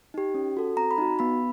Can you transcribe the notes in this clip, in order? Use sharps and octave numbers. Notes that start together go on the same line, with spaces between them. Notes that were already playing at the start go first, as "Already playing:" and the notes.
D#4 G4
C#4
F#4 A4
C4 A#5
B5
D#4 F#4
B3 B5